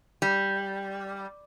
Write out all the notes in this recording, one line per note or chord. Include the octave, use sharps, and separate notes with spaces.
G3